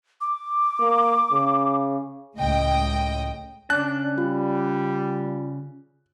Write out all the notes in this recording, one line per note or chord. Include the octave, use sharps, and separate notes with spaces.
D6
A#3
C#3
C#2 A2 D#5 G5
C#3 C#4 D4 A5 F#6
G3 F4